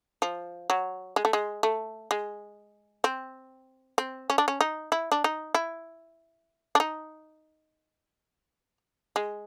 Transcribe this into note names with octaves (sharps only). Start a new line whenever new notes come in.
F3
F#3
G#3
A3
G#3
A3
G#3
C4
C4
C#4
D4
C#4
D#4
E4
D4
D#4
E4
D4
D#4
G#3